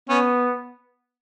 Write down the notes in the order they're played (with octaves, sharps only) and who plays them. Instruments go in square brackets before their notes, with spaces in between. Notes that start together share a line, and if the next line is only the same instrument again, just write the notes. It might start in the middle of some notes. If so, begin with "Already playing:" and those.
[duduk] B3 [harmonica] C#4